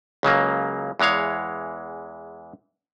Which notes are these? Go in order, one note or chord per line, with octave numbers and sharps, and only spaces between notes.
C#2 C#3 F#3 A#3
E2 E3 G#3 C#5 F5